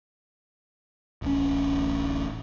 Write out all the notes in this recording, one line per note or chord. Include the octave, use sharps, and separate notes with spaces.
D1 A1 C#4